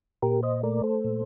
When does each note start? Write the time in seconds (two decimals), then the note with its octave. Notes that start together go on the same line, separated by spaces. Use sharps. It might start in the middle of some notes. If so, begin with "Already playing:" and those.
0.22 A#2 G4 A#4
0.43 C5 D#5
0.63 A3 A#4 D5
0.83 A4 C5
1.04 A#2